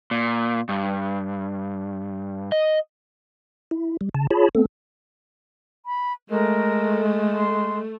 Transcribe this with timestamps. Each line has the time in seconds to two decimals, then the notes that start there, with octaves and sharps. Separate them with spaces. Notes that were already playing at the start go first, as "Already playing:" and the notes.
0.11 A#2
0.69 G2
2.52 D#5
3.71 E4
4.01 G3
4.15 C#3 A5
4.31 F4 G#4 C#5 A5 B5
4.55 A3 B3 C4 A4
5.86 B5
6.30 G#3 A3 A#4
7.36 C6